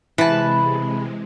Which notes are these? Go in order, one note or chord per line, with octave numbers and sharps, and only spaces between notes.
C3 E3 G#3 B4 A5